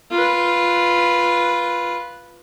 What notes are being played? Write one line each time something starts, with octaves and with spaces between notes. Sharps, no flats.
F4 B4